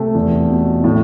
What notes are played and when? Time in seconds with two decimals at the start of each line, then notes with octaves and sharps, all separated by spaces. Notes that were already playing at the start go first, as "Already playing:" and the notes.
Already playing: C3 A3
0.15 E2
0.50 B2
0.84 A2